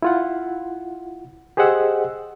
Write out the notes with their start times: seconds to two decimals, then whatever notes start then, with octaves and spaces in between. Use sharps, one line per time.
0.02 E4 F4 F#5
1.57 G4 G#4 C5 D#5 F#5 E6